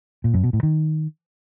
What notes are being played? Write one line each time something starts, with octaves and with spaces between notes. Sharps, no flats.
A#2
F#2
B2
A2
D#3